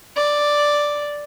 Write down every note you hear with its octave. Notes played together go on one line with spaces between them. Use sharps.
D5